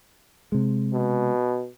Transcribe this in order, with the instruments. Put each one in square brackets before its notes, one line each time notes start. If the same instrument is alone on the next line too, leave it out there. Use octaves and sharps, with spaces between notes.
[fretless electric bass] C3 G#3
[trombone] B2